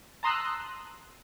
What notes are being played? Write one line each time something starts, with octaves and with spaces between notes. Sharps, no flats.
A5 A#5 C6 D#6 E6 F#6